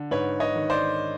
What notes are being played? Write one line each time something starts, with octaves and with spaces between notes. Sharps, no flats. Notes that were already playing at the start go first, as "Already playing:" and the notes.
Already playing: D3
G#2 B4 C#5
C#5 D#5
D#3
C5 D5